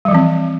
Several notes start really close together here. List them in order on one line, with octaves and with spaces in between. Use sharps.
G3 F3 E3 C4